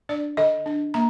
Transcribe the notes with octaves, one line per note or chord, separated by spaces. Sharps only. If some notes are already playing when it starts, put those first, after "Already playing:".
D4 D5
D3 D#5
D4
A#3 A#5